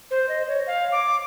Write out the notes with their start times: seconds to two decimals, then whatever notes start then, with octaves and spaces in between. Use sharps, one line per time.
0.11 C5
0.29 D#5
0.47 C#5
0.67 F5
0.92 D6